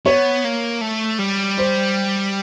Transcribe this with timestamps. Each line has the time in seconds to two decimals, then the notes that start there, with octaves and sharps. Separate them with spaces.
0.05 B3 C#5
0.44 A#3
0.81 A3
1.19 G3
1.58 C5